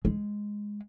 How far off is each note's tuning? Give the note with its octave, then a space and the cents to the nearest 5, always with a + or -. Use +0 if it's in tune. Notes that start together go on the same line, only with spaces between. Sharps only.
G#3 -5